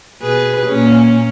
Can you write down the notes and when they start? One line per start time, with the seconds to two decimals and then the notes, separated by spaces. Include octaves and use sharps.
0.22 B2 G#4 B4
0.67 A#2 A#3 C#4